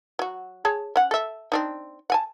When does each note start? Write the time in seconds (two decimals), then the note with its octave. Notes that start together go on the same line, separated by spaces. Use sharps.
0.19 F#3 F#4
0.65 G#4 C#5 A5
0.96 C#4 F#5
1.11 A4 E5
1.52 C4 D4 D#4
2.10 F#5 G#5 A5